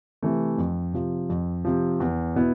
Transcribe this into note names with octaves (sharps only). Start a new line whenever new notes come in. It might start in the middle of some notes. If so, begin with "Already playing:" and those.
C3 E3 A3
F2
C3 F3
F2
C3 F3
E2
B2 B3 E4